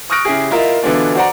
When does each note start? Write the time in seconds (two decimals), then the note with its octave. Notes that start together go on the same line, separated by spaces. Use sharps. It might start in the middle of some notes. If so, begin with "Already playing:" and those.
0.10 C#6 D#6 F6 F#6 A#6 D7
0.25 C#3 E4 G4 G#4
0.51 E4 F4 A#4 D#5 E5
0.83 B2 D3 E3 B3 D4 F4
1.15 F#4 C5 D5 F#5 A#5